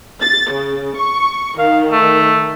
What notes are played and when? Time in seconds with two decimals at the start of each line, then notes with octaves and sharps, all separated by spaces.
0.21 A6
0.52 C#3
0.97 C#6
1.59 D#3 F5
1.92 A3